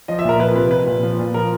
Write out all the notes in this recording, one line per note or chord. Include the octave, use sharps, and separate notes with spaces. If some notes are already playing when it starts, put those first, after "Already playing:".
F3 D#5
E5
A#2 A#4
F3 B4
C3 B4
F3 B4
A#2
F3
A#2
F3 A#4